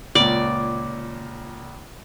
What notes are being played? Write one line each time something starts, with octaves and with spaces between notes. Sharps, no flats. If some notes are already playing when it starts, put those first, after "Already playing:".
C#2 A#2 D5